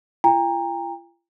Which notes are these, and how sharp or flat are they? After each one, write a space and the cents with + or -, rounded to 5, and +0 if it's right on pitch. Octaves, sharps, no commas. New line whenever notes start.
F4 -45 G5 +40 A#5 +0